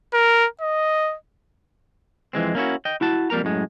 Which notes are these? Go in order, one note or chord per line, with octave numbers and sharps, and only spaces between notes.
A#4
D#5
F2 E3 G#3 C4
A#3 C#4 E4 F#4
D#5 G5
E4 F#4 A5
F2 G3 A#3 A#4 A#5
F#2 A2 G#3